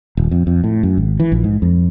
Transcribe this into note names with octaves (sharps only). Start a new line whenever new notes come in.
D#1
F2
F2
A2
F#2
G#1
E3
A#1
G#2
F2